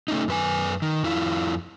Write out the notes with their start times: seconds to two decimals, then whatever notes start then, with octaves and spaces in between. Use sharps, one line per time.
0.08 A3 C#4 D#4
0.28 F#2 B4 G#5
0.82 D#3
1.04 F2 E4 F4